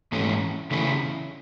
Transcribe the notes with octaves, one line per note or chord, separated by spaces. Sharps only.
G#2 E3 A3 C#4
C#3 E3 A3 C#4 E4